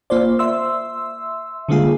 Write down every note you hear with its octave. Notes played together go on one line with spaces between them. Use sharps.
A#3 F4 C5 D5
E5 C6 E6
D3 G3 G#3 A#3 F4 G#4